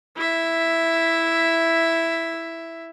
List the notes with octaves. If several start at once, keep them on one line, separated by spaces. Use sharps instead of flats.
E4 E5